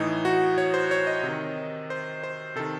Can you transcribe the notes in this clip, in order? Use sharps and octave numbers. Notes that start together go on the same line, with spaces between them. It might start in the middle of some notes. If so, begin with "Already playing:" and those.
Already playing: A2 E3 D#4
F#4
C#5
C5
C#5
D#5
C3
D#3
C5
C5
C3 D#3 A4